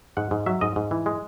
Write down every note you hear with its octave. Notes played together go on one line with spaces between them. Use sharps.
G#2 F#5
G#2
F#3 E5
G#2 D#5
G#2
E3
G#3